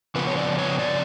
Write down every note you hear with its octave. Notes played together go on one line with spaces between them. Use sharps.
C#3 F3 B3 B4
C#5
D5
C#5
D5